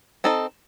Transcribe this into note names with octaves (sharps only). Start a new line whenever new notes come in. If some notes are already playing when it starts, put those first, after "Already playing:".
C4 D#4 A4 D#5